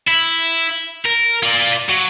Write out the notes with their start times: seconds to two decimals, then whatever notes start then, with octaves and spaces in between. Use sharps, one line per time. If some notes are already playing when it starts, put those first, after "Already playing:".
0.08 E4
1.05 A#4
1.43 F4 D5
1.89 F#3